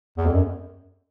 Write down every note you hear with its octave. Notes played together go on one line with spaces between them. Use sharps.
E2
F2
F#2